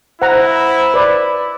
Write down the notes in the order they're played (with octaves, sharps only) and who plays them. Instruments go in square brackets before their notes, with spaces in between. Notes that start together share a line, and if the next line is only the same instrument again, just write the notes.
[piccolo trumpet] E4 [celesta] C5 [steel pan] F#5 A#5
[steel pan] B4 D5